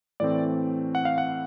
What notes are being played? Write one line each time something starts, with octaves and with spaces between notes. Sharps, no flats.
A2 E3 A3 C4 D5
F#5
F5
F#5